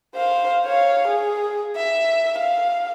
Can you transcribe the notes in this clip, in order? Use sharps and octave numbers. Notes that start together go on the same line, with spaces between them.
C5 F5
C#5 F5
G#4
E5
F5